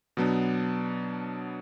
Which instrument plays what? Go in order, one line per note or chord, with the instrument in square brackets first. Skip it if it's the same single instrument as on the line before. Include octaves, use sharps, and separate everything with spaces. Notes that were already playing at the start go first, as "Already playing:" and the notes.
[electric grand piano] B2 F#3 B3 D4